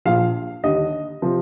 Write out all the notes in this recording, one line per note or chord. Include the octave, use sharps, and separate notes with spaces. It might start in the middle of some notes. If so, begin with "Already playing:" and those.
A#1 A#2 F3 F5
D#2 D3 G3 D#5
C3 F3